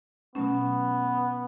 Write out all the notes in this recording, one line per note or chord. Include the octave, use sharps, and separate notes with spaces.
B2 F#3 A3 B3 C#4